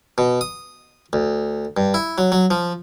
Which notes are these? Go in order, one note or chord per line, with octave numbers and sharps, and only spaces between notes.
B2
D#6
D2
G2
E4
F#3
F#3
F3